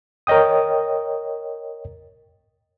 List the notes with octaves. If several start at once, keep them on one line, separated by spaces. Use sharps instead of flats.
A#4 C#5 D#5 G5 D#6